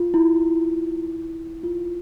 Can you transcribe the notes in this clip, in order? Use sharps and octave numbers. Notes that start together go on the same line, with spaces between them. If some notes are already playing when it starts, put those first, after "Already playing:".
Already playing: F4
E4
F4